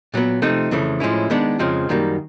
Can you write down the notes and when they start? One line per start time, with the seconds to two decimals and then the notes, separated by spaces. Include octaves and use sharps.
0.14 A#2 F#3 B3
0.42 C3 F3 A3 C4 D#4
0.71 F2 C#3 E3 A3
1.00 A2 F3 G#3 C#4 E4
1.30 D#3 G#3 B3 D4
1.59 F2 C#3 F3 G#3 C4
1.89 F#2 D#3 G3 A#3